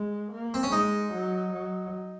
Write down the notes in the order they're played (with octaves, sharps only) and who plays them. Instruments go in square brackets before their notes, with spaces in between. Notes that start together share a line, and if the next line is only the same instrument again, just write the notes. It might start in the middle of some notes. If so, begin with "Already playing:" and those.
Already playing: [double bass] G#3
A#3
[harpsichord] C4
C#4
[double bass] G#3 [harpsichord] D#4
[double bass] F#3
F#3